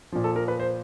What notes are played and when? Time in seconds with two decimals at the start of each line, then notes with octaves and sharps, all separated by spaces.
0.12 A#2 F3
0.24 A4
0.36 A#4
0.48 B4
0.60 C5